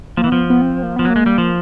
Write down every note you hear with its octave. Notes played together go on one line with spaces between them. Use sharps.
F3 A#3
E3
F3 B3
B3
C4
A#3
F3 B3
F#3
A#3
G#3
G3
F3